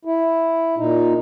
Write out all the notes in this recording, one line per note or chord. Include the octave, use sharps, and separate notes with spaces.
E4
A#2 D#4